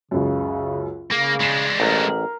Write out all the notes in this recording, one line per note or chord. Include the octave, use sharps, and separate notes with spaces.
C#2 F#2 C#3
C#3 A#3 G#4
G#3 D4 B6 C7 E7
A1 A#4